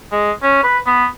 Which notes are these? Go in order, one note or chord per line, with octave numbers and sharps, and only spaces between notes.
G#3
C#4
B4
B3